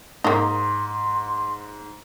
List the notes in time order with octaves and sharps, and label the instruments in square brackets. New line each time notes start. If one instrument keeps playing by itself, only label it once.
[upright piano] G#2 [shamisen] A#3 D#4 [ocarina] C6